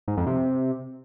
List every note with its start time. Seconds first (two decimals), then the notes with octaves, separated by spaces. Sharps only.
0.08 G#2
0.17 F2
0.27 C3